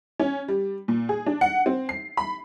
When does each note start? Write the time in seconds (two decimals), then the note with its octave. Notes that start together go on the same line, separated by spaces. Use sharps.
0.19 C#4
0.48 G3
0.88 A#2
1.09 G#4
1.26 D4
1.41 F#5
1.66 C4
1.89 C7
2.17 B5